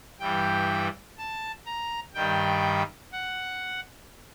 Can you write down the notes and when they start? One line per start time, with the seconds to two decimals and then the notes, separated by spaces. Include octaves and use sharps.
0.20 G2 E3 G3 G5
1.18 A5
1.66 A#5
2.14 G2 D#3 G3 G5
3.12 F#5